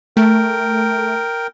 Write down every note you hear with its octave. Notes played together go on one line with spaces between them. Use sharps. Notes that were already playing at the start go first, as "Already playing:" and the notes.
A3 A#4 G5